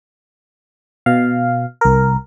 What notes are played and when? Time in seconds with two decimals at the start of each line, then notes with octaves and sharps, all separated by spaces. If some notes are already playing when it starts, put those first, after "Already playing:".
1.06 B2 F5
1.81 C2 A#4